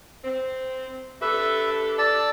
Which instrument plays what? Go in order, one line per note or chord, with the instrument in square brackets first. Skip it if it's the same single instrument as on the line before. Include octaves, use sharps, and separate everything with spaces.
[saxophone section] C4
[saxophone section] D4 G4 A4 [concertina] B4 E5
[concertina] D5 A5 E6